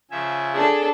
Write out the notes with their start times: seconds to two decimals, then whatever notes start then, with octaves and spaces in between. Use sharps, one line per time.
0.11 C#3 F3 E5 G#5
0.54 D4 G#4 A4